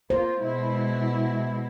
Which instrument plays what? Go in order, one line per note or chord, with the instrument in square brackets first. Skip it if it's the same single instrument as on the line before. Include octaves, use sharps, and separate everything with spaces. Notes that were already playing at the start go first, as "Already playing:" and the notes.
[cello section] A#3 F4 [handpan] C5
[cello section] B2 G#3 E4